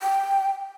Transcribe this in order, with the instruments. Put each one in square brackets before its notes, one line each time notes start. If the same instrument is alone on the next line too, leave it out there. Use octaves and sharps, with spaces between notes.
[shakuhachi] G5